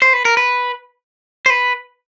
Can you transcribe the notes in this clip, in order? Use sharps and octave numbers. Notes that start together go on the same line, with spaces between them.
C5
B4
A#4
B4
C5
B4